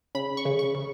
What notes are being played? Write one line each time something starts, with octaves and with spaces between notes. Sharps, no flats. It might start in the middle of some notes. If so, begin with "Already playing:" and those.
C#3 B5
C#6
C#3
C#6
C#3